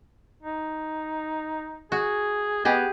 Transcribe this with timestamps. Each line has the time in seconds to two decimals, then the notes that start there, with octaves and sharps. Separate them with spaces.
0.43 D#4
1.92 F#4 G#4
2.65 B3 G4 G#4 D#5